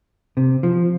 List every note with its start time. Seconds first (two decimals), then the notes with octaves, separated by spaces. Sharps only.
0.37 C3
0.63 F3